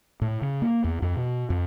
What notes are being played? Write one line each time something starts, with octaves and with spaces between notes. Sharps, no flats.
A2
C#3
A#3
E2
F2
B2
F2